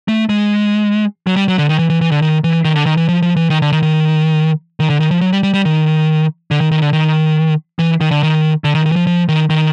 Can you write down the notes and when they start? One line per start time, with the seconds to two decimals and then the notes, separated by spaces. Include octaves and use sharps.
0.08 A3
0.29 G#3
1.27 F#3
1.36 G3
1.48 F#3
1.58 D3
1.69 D#3
1.79 E3
1.90 E3
2.01 E3
2.12 D3
2.22 D#3
2.44 E3
2.65 D#3
2.75 D3
2.86 D#3
2.97 E3
3.09 F3
3.22 F3
3.36 E3
3.50 D#3
3.62 D3
3.72 D#3
3.83 D#3
4.80 D#3
4.90 D3
5.00 D#3
5.11 F3
5.21 F#3
5.33 G3
5.43 G3
5.54 G3
5.65 D#3
6.51 D3
6.61 D#3
6.71 D#3
6.82 D3
6.93 D#3
7.79 E3
8.01 D#3
8.11 D3
8.23 D#3
8.64 D3
8.75 D#3
8.86 D#3
8.92 E3
8.96 F3
9.07 F3
9.28 D#3
9.50 D#3